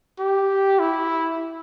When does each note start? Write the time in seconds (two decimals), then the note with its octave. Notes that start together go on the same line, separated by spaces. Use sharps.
0.19 G4
0.79 E4